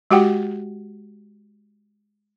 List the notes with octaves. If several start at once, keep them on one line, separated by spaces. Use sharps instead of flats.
G#3 F#4 G4 F#5 G5